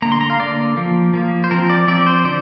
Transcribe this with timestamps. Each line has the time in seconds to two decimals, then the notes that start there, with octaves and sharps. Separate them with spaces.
0.02 D3 A#3 A#5
0.12 C6
0.21 A#5
0.30 F5
0.39 D3 A#3 D5
0.77 F3 A#3
1.13 F3 A#3
1.44 C5
1.51 F3 C4 A#4
1.70 D5
1.87 F3 C4 D5
2.06 C5
2.24 D3 D5